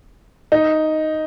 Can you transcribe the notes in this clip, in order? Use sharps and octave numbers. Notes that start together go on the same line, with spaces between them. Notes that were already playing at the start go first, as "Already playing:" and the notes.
D#4